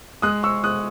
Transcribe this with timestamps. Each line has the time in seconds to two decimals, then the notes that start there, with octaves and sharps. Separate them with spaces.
0.22 G#3 D#6 F#6
0.43 C#6 E6
0.64 G#3 D#6 F#6